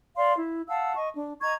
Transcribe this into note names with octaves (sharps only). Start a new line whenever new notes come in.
D5 F5 C6
E4
F5 F#5 A5 E6
D#5 C#6
D4
D#5 A#5 C#6 G#6